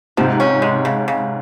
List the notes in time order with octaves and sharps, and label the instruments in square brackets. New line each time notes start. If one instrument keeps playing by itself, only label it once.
[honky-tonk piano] G#2 C3 [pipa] F3
[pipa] C#4
G#3
C#3
C#3